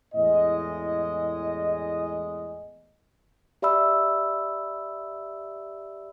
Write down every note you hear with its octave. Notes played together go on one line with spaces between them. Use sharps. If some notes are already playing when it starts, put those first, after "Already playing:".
E2 A2 G#3 D#5
G4 D5 E5 B5 E6